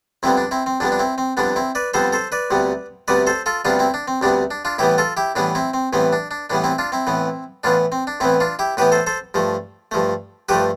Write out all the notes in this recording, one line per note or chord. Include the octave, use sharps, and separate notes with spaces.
F2 D3 G3 B3 C4 E4
D4
C4 E4
C4
F2 D3 G3 B3 D4
D4
C4 E4
C4
F2 D3 G3 B3 D4
C4 E4
B4 D5
F2 D3 G3 B3 A4 C5
A4 C5
B4 D5
D2 C3 G3 B3
D2 C3 G3 B3 B4 D5
A4 C5
F4 A4
D2 C3 G3 B3 D4 F4
C4 E4
D4
C4
D2 C3 G3 B3 D4
D4
D4 F4
A2 E3 G3 B3 E4 G4
F4 A4
E4 G4
A2 E3 G3 B3 D4
C4 E4
C4
A2 E3 G3 B3 C4
D4
D4
A2 E3 G3 B3 D4
C4 E4
D4 F4
C4 E4
A2 E3 B3
A2 E3 B3 D4 F4
C4
D4
A2 E3 B3 C4 E4
D4 F4
E4 G4
A2 E3 B3 G4 B4
A4 C5
A4 C5
G2 F3 A3
G2 F3 A3
G2 F3 A3 G4 B4